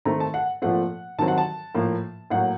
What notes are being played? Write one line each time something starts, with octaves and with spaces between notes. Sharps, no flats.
D#3 A3 C4 A#5
A5
F#5
A#2 F3 A3 C4 F#5
D#3 F#3 C4 A5
F#5
A5
A2 F3 A#3
A2 F#3 A#3 F#5